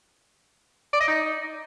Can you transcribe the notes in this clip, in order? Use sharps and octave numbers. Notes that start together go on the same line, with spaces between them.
D5
D#5
D#4